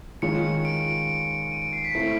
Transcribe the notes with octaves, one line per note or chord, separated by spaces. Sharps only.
D#3 G#3 C#4 F4 C#7
D7
D#7
D7
C7
B6
A3 C4 E4